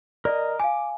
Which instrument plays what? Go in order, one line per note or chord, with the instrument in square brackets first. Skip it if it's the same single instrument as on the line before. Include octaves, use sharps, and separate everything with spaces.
[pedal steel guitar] A#4 D#5 [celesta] D5
[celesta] F5 G#5 [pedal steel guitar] D6